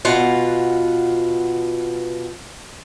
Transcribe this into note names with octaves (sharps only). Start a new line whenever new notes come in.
B2 F4 F#5